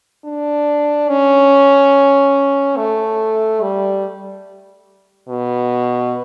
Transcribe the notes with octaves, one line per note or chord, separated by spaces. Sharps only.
D4
C#4
A3
G3
B2